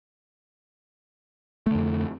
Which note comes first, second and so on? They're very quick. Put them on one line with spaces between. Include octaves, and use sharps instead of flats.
A3 D3 F2